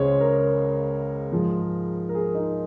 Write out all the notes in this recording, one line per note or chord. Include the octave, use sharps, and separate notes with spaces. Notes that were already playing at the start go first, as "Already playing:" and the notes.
Already playing: C#2 C#3 G#3 C5 C#5
A#4
G#2 F3 G#3
A#4
G#4
D#4